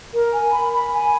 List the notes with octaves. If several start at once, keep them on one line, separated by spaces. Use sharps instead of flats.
A#4
G#5
B5
B5
G#5